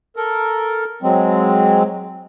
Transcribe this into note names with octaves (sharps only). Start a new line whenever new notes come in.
A4 A#4
F#3 G#3 C4